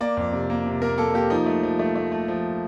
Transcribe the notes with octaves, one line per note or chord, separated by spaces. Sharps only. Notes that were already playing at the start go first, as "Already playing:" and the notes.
A#3 D5
F2
C3
A#3
C3
A#3 A#4
A#3 A4
A#3 G4
F3 D#4
A3
F3
A3
A3
A3
F3